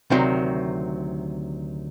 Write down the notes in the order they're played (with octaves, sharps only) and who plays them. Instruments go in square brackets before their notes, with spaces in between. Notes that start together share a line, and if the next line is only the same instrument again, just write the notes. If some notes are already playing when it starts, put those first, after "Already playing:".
[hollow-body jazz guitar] D2 C3 D#3 F#3